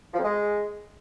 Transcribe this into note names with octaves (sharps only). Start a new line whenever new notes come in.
F3
F2
G#3